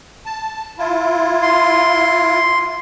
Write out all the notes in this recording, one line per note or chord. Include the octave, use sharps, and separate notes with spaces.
A5
E4 F4
C6